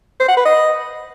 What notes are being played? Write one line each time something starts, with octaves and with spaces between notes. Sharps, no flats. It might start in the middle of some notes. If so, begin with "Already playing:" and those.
C5
F#5
B4
D#5